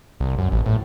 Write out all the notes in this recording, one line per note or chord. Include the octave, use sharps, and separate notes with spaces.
C2
F#2
A1
A2